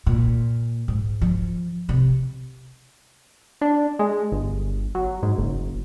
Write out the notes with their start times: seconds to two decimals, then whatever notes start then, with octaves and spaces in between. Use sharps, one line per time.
0.06 A#2
0.88 G#2
1.21 F3
1.89 C3
3.61 D4
3.99 G#3
4.32 G1
4.95 F#3
5.22 G#2
5.38 F#1